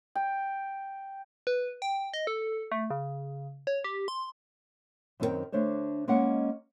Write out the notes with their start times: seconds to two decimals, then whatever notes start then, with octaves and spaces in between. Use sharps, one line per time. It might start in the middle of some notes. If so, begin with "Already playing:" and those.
0.15 G5
1.47 B4
1.82 G5
2.14 D#5
2.27 A4
2.72 A3
2.90 C#3
3.67 C#5
3.84 G4
4.08 C6
5.20 F#2 D#3 C4 A4 A#4 G5
5.52 D3 A3 D4 C5 C#5
6.08 G#3 A#3 C#4 D#5 F#5